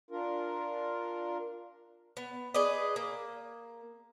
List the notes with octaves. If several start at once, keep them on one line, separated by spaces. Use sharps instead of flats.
D4 F4 A#4
B3
G#4 B4 D5 D#5
A#3